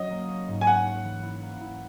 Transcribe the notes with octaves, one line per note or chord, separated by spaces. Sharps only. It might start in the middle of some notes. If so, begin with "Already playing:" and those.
Already playing: F#3 C#4 D#5
A#3
C#4
G#2
G#5
C#4 F#5
C#4
E3
E4
A#3
E4